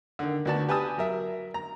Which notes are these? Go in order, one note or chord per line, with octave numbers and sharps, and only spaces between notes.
D3 D#3
D2 B3 F#4 D5 A5
G4 B4 G#5 A5 D#6
F#3 A#4 E5
A#5